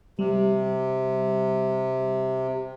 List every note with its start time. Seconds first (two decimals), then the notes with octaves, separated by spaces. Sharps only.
0.19 C3 G3